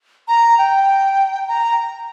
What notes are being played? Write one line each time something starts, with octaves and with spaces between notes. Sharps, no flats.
A#5
G5
A#5